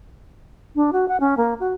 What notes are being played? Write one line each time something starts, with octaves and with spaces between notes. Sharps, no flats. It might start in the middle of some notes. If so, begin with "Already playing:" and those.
D4
F#4
F#5
C#4
A#3
F#4